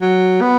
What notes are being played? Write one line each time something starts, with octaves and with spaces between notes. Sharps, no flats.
F#3
B3